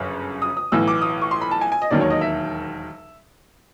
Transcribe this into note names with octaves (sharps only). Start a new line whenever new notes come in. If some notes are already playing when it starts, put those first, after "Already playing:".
Already playing: G1 F#2 C#3
D#6
D#6
B1 A2 E3 E6
D6
D#6
C#6
C6
B5
A5
G#5
G#5
D#5
E1 D#2 D#3 F#3 D5
C#5
D#5
E5